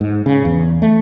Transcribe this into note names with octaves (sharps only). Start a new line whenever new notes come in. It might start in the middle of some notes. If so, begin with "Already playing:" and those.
G#2
C#3
E2
A3